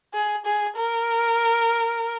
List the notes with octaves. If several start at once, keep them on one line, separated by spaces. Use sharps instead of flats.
G#4
G#4
A#4